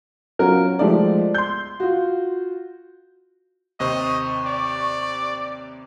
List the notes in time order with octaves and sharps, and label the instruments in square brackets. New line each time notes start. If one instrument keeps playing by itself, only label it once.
[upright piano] F#3 C#4 F4 F#4 A#4
F3 G#3 A3 G4 D5
C6 G6
F4 F#4
[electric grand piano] D#2 C3 C5 [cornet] D#5 [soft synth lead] C#6
[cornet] D5